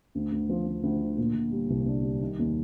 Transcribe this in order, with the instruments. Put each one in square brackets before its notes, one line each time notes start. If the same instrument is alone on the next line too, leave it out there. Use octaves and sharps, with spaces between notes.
[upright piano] D2
D2
F3
F3
D2
D3
A#2
A#2
G3
C2
D4
G3
D#3
D#2